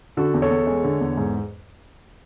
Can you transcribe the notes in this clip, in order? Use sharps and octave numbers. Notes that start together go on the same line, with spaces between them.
D3 F#4 A4
E2
A4 C#5
E2
G#3
D3
E2
G#2